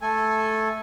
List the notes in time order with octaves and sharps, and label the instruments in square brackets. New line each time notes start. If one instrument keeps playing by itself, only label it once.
[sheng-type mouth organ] A3 A4 G#5